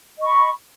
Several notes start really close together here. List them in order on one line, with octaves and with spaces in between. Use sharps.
D#5 C#6 B5